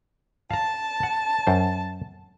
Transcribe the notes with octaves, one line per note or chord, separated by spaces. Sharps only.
F5 A5 A#5
F#5
F#2 C5